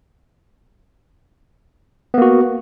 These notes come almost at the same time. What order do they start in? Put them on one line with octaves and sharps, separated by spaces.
B3 A#3 F#4